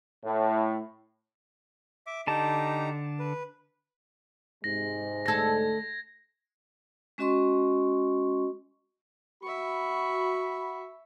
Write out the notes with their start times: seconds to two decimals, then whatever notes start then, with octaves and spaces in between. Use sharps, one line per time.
0.24 A2
2.07 E5 D6
2.27 D3 D#4 G4 A5 A#5
3.19 B4
4.64 G#2 C3 G#3 A#6
5.26 D2 A4 G#6 A#6
7.18 G#3 C#4 F#4 D#5 C6 C#6
9.43 F#4 E5 B5 C#6